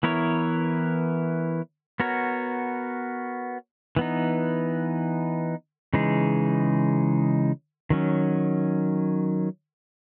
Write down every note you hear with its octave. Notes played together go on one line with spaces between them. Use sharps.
E3 B3 E4 A#4 C#5
B3 F#4 A#4 C#5
E3 B3 D#4
C#3 E3 G#3 D#4 G#4
D#3 F#3 C#4